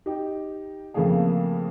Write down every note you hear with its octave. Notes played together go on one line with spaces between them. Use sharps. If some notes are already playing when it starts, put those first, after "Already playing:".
D#4 G4
F2 C#3 A3 A#3 G#4